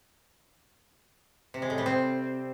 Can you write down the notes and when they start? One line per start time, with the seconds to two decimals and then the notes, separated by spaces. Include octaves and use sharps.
1.54 C3
1.62 G#3
1.70 A2
1.78 G3
1.86 C4